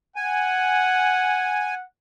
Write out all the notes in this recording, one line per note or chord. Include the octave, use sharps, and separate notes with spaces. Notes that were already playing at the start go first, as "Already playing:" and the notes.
F#5 G#5